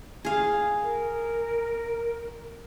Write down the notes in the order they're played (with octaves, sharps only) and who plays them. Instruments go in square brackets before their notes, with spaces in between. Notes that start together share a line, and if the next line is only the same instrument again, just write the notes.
[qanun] G#4 F5
[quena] A#4